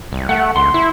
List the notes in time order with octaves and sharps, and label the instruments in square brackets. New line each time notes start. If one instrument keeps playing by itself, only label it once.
[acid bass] C2
[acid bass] A3 [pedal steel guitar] F#5
[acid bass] C#2 [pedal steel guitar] C6
[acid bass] E4